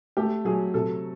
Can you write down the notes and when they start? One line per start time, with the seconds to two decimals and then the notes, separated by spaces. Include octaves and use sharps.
0.17 A3 G4
0.45 F#3 G#4
0.74 C3 A4